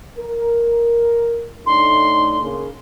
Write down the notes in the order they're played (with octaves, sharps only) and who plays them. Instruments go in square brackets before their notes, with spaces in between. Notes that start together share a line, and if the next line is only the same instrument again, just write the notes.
[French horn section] A#4
[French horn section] A2 D4 D#4 [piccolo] C6
[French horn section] C#3 A#3